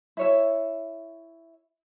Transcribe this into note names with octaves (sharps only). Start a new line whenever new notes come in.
E4 C#5 E5